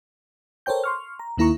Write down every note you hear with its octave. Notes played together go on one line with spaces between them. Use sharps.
A4 A#4 C5 C#5 G5 G6
C6 C#6 F6
A#5
D#2 D#3 A#3 E4 A#5 C#6